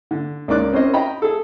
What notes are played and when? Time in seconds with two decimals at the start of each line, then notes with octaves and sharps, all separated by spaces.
0.11 D3
0.48 C#2 A#3 D#4 D5 D6 F#6
0.73 C4 C#4 A#4 C5 D#5
0.94 D#5 G5 A#5 B5
1.22 G#4 A4